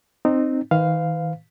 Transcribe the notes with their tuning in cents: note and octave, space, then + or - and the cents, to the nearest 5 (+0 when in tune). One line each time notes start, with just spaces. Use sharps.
C4 +0 D#4 -20
D#3 +40 B4 +40 F5 +0